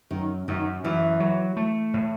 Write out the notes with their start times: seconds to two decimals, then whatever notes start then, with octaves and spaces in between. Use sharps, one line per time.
0.11 F#2 D#3
0.48 F#2 D#3
0.84 F#2 E3
1.20 F#3
1.57 A3
1.94 A2